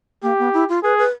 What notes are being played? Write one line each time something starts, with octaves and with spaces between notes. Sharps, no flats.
A#3 G4
B3
E4
F4
G#4 B4
B4